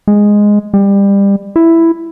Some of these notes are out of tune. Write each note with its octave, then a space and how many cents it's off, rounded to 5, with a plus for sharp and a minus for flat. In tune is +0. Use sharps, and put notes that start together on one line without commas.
G#3 -5
G3 +25
E4 +5